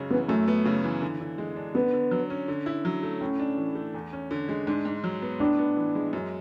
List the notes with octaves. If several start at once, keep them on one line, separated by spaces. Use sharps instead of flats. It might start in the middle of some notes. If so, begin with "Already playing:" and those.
Already playing: F#2 C#3 G#3
E3 B3
F#2 A3
B3
C#3
E3
D3
D3
G#3
D4
D3 B3
D3
F#3
C#4
D3
E4
F#3
A3
A2 C#4
D4
E3
A3
E2
C#4
D3
G#3
G#2 D4
G#2
F#3
B3
A2 D4
B3
E3
G#3
F#2